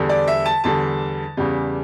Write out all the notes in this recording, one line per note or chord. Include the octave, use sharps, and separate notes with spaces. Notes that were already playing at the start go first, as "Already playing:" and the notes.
Already playing: E2 D3 G3
D5
E5
A5
E2 D3 G3 A5
E2 C#3 G3